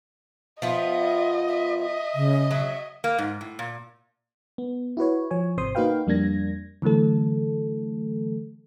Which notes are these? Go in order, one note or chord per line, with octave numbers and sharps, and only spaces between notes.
F3 B3 F4 D#5 E5
E5
D#5
C#3
F#3 E5
A#3
G#2
A2
A#2
B3
E4 F#4 B4 C#5
F3 C#5 G#5
G#1 C3 C5 C6 D#6
A#3 D#4 F#4 B4 F5 G5
F2 G3 A#3 D4 G#6 A#6
D3 E3 F#3 A3 A4